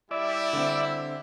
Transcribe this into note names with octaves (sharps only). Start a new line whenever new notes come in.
G3 E4 D5 E5
D3 C4